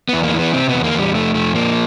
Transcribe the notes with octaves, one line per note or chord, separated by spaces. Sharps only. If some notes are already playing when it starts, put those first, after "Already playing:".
E2 B3
A#3
E3
B3
C3 C4
E2 B3
A#3
E2 G3
F2 A3
F2 A3
F3 A#3